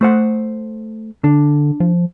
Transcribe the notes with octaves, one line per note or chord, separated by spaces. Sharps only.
A3 C5 F#5
D3 D4
F3